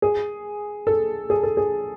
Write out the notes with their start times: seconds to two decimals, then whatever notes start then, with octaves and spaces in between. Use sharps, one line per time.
0.02 G#4
0.87 A4
1.30 G#4
1.43 A4
1.57 G#4